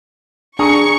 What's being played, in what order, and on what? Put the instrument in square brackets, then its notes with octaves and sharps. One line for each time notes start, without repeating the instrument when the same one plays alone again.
[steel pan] D4 [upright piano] G#4 A#5 D#6 [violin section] C#6